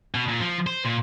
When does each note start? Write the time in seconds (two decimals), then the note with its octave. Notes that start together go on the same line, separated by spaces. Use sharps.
0.15 B2
0.28 A#2
0.41 F3
0.67 C5
0.85 A#2